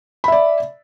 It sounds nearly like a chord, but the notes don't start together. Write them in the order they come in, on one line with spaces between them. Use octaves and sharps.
B5 E5 D5